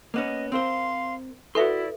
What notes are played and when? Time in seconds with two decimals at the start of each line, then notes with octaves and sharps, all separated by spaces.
0.14 A#3 B3 C#4 D#5
0.52 C4 A#4 C5 F5 C6
1.55 E4 F#4 A4 B4 D5 E5 C6